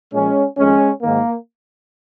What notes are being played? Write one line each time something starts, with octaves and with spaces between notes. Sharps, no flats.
A#2 F3 G#3 C#4
F2 D#3 G#3 C#4
G#2 D#3 A#3